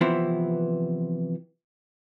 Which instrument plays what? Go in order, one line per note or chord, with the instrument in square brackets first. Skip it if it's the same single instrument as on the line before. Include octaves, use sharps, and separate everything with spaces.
[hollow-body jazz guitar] C3 E3 F3 B3 C4 E4